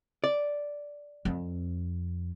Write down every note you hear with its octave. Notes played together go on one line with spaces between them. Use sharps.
D5
F2 C4